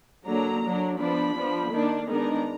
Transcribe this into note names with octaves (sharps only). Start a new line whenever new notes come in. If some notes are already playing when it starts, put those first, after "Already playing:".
D3 F#3 A#3 D4 A#5
F#3 D4
F3 B3 D4 B5
F3 B3 D4
D#3 A#3 D4
D#3 G#3 B3 D4 A#5